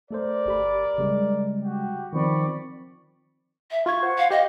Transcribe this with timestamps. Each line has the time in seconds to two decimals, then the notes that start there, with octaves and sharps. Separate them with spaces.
0.11 A3 A4 A#4 C5 D5
0.46 G1 G4 B5
0.98 C#3 G3 G#3
1.62 F#4 G4
2.13 D#3 F3 C4 D5 B5 C#6
3.71 E5
3.86 F4 C#6 G#6
4.03 C5 F#5
4.18 F5
4.31 G4 D#5 F5